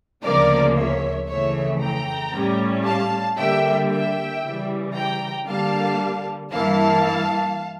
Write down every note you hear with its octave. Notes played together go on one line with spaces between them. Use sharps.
D2 C#3 F3 A#3 C#4 A#4 D5
C#5 E5
F2 C#3 E3 A3 C#5 E5
G5 A#5
A2 G3 C#4
F5 A5
D3 G3 A#3 E5 G5
E5 G5
C#3 E3 G3
G5 A#5
D3 G3 A#3 F5 A5
G2 E3 A#3 E4 F5 A5